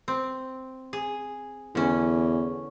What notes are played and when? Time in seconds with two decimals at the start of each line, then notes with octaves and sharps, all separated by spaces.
0.08 C4
0.93 G#4
1.75 E2 D3 C#4